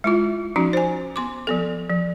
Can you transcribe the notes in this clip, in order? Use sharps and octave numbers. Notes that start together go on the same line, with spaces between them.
G#3 E4 F4
F3 C#4 D#4 F#4
C5 G#5
B3 C6 D6
F3 B3 A4
F3